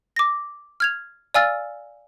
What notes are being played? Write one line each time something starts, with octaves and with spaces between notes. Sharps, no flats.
D6 A#6
F6 G#6 F7
D5 F5 G#5 E6 F6 A6